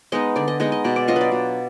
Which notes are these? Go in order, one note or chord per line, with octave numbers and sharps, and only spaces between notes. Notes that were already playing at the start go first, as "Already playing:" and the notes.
G#3 B3 D#4 D#5
D3 D5
D#5
G#3 B3 D#4 D#5
D#5
B2 D5
D5
F#3 D4 F4 D#5
B4 D5
B2